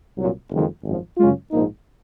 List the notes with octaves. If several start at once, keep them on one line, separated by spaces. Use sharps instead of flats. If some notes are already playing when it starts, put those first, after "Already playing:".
C2 A#2 F#3
F#1 F2 D#3 G#3
G#1 F#2 F3
F#2 C#3 G#3 C#4 F4
A#1 G#2 F3 A#3 D#4